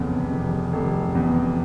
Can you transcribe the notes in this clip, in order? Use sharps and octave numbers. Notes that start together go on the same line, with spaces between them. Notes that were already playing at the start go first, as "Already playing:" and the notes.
Already playing: F1 E2 C#3
F1
F1
E2